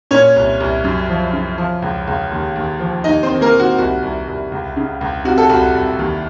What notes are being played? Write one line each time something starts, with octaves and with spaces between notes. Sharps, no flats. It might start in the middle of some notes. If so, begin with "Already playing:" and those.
A#2 C#4 C#5
C2
C2
F#2
F3
C#3
F3
C#2
C#2
D#2
D#2
F3
D#2 D#4 D#5
C4 C5
D#3
A#3 A#4
D#3
F#4
C2 F#4
C2
C2
C#2
C#3
C#2
C3 F#4
A4
C2 F#4
C2
D#2